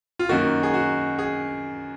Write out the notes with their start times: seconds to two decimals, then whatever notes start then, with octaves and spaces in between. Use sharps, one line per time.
0.19 F4
0.29 F#2 D#3 A#3 F#4
0.63 G#4
0.74 F#4
1.19 G#4